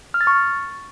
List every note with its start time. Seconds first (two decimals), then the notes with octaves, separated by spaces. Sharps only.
0.14 F6
0.21 A6
0.27 C#6